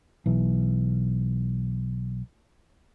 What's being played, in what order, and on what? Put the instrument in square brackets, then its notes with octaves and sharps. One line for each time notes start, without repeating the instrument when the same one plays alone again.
[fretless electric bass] B1 E3